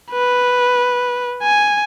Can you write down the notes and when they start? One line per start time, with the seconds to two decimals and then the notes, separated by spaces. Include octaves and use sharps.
0.12 B4
1.43 G#5